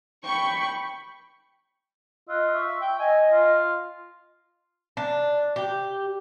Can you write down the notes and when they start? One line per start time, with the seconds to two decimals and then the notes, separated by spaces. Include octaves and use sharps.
0.25 G5 B5 C#6
2.28 F4 D#5 E6 F#6
2.53 E5 C#6 E6
2.82 G5
2.99 D#5 G#5
3.31 F4
4.97 D4
5.56 G4